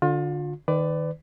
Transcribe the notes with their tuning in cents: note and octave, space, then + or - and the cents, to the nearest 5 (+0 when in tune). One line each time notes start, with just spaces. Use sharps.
D3 +0 F4 +35
D#3 +0 B4 +30 D5 +0